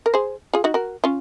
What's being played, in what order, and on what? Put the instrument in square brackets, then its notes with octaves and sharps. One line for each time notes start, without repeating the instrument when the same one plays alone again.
[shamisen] A#4
G#4 C5
F4 G#4
D#4 F#4
F#4 A#4
C#4 F4